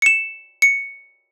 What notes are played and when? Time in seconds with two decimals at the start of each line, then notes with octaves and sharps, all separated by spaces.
0.02 C#7 E7
0.62 C#7